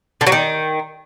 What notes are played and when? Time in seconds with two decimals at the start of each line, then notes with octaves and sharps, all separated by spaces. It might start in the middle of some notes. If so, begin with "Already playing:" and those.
0.21 D3
0.27 F#3
0.32 D#3